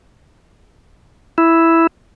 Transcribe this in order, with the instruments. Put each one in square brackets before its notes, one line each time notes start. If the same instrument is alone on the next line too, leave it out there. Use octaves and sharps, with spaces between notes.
[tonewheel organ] E4